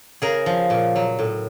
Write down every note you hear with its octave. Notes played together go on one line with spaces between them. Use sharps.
C#3 G#4 A#4
F3
A#2
F#3
A2